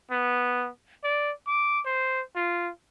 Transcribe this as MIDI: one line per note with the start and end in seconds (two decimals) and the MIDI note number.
0.11 0.69 59
1.04 1.32 74
1.47 1.81 86
1.85 2.22 72
2.35 2.71 65